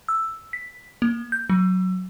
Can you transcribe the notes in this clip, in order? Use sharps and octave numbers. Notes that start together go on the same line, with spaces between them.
E6
B6
A#3
G6
F#3